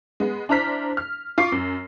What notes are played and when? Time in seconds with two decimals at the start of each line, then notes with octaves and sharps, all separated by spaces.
0.20 G#3 B3
0.49 D4 E4 C5 A#5 F6 B6
0.97 F6
1.38 F4 C#6 D6 C7
1.52 F#2